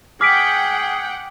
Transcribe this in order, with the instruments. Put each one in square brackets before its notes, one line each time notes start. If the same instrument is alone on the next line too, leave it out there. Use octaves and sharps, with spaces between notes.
[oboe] G#4 [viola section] F#5 G5 [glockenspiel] D6 [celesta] F6 B6 D7